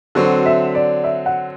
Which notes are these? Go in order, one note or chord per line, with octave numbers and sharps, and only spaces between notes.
D3 F#3 C4 F#4
E5
D5
E5
F#5